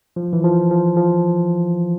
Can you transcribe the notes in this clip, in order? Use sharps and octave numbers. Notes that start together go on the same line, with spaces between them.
F3
E3
F3
F3
F3